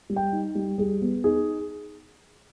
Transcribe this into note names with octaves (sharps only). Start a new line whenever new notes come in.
G3
G5
D#4
G3
G3 G#4
B3
D#4 G#4